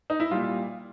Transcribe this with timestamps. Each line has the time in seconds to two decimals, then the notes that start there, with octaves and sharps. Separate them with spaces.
0.10 D#4
0.20 E4
0.31 A#2 G3 F4